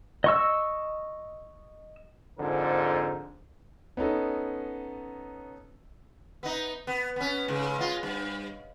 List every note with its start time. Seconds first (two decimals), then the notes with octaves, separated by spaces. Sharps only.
0.24 D#5 C#6 E6
2.39 F2 G#2 D3 F3 A#4 C5
3.97 B3 C#4 D#4 A4
6.43 B3 D#4
6.87 B3
7.16 B3 C#4
7.48 G#2 C#3
7.78 G#3 B3 F4
8.03 G2